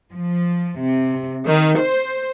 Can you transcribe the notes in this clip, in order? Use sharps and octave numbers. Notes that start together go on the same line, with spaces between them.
F3
C3
D#3
C5